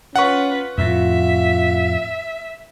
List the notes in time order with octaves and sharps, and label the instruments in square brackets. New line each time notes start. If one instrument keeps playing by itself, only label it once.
[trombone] C#4 [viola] F4 B4 [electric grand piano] F#5 C#6
[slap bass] F2 A2 [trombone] F4 [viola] E5